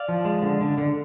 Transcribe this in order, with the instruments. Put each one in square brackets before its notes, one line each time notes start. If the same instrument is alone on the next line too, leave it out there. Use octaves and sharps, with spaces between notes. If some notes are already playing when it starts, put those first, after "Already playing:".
Already playing: [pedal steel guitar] D5 F5
F3
G#3
D3
D3
D3